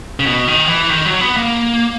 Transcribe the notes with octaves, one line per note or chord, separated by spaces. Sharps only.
C#3
B2
D#3
E3
D#3
F#3
B3
A#3